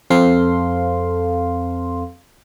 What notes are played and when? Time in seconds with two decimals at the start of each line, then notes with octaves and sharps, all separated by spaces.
0.10 F2 C4 A4 F5 C6